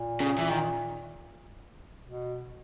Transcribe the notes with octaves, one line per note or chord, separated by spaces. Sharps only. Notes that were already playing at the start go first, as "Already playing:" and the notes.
Already playing: A#2
C#3
E3
D#3
B2